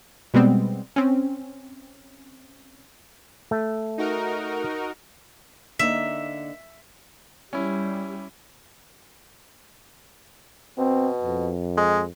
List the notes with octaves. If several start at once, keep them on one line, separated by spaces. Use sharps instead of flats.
B2 G3 G#3 B3 C4
C4 C#4
A3
D#4 F#4 A#4
D3 A#3 D#4 E5
G3 C#4 E4
B2 C4
F2
G#3